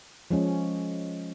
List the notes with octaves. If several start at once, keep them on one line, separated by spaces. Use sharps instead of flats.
F3 G#3 C#4